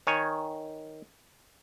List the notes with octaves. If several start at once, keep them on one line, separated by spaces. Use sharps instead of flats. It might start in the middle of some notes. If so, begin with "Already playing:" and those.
D#3 C#5 G#5